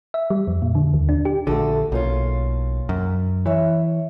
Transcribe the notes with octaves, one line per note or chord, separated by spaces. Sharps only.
E5
G3
F2
A#2
D3
D#2
D4
G4
A#1 D3 A3 F#4 A4
B1 A#3 C#4 F4
F#2
E3 C#5 E5